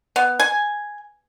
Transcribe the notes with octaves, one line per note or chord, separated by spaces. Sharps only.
B3
G#5